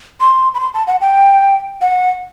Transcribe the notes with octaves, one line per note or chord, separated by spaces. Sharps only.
C6
B5
C6
A5
F#5
G5
F#5